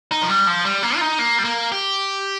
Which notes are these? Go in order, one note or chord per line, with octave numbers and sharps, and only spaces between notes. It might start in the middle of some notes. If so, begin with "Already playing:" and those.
D#4
F3
G3
F3
G3
A#3
F4
D#4
A#3
G3
A#3
G4